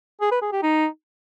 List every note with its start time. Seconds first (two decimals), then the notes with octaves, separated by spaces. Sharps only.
0.21 G#4
0.32 B4
0.42 G#4
0.52 G4
0.63 D#4